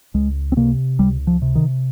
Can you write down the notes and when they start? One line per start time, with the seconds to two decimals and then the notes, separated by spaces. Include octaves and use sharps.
0.14 C#2 G#3
0.52 C4
0.57 C3 A#3
0.99 C#2 G3
1.27 F3
1.42 C3
1.55 D#3